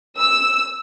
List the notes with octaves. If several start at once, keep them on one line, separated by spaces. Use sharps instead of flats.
E6